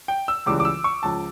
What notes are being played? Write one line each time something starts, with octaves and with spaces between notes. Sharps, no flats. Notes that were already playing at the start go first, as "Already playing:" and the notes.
G5
E6
C#2 C#3 E3 G3 D6
D6
E6
C#6
C#2 C#3 F3 A5